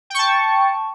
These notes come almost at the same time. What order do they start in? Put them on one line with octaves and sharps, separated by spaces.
G5 C#6 A5